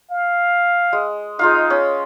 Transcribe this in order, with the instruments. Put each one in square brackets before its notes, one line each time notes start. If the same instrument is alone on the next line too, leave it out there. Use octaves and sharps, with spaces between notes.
[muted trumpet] F5
[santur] G#3
[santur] G#3 F4 F5 [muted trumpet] D#4
[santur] C#4